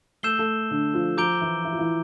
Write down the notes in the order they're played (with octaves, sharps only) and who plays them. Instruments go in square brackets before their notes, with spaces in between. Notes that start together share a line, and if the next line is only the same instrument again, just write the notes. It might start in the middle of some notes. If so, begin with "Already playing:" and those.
[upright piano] A3 A4 [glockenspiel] E6 G6 C7 E7 G7
[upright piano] A3 A4
D3 D4
F3 F4
[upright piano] F3 F4 [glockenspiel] A#5 D6 G6 D7 G7
[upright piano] E3 E4
E4
F4
E3 E4